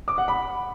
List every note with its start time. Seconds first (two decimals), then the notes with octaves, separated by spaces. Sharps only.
0.08 D6
0.18 F#5
0.28 B5